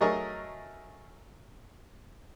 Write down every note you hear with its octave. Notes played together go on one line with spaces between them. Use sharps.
F#3 A3 G#4 A#4 D#5 C#6